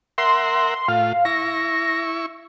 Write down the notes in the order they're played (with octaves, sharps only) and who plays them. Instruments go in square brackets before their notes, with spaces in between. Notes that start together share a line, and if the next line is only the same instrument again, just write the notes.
[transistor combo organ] A#4 E5 F#5 [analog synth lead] C6
[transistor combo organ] A2 F4 [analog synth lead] F5
[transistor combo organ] E4 C#6 [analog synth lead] A#6